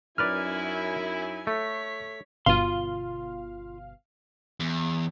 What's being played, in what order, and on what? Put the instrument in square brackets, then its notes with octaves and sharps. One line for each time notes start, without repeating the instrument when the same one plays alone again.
[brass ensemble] F#2 E4 [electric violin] D#4 G#5 [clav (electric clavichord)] A#4 B4 D5 [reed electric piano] F6
[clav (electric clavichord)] A3 [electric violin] C#5 B6
[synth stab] G1 B2 F5 [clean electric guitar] F4 C6
[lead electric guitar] E2